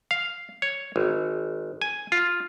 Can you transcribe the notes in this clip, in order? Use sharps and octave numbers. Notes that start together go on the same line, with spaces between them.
F5
C#5
G#1
G#5
F4